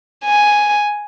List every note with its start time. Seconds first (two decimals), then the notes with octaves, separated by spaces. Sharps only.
0.25 G#5